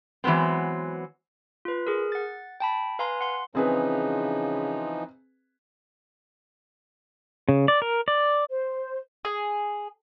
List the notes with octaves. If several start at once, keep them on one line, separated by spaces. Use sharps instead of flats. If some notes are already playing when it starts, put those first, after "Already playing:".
E3 F#3 G#3 B3 C4
F4 B4
G#4 A#4
F#5 A6
G5 A5 B5
B4 F5 G#5 A#5 C6
F#5 C6
C#3 E3 F3 C4 D#4 G#4 B4
C#3
D5
A#4
D5
C5
G#4